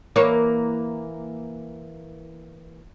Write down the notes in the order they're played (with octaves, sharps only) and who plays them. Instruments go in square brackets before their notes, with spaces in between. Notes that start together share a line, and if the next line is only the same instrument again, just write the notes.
[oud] E3 A#3 C#5